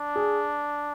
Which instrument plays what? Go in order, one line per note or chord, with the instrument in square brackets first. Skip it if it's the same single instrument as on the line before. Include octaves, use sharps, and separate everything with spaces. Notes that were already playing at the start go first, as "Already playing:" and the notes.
Already playing: [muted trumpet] D4
[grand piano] G#4